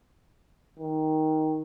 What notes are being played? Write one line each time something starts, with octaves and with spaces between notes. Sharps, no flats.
D#3